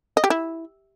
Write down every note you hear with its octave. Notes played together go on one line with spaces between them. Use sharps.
D#5
G4
E4